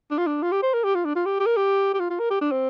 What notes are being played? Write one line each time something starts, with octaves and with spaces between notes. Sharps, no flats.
D4
F4
D4
F4
G4
C5
A#4
G4
F4
D4
F4
G4
G4
A#4
G4
G4
F4
F4
A#4
G4
D4
C4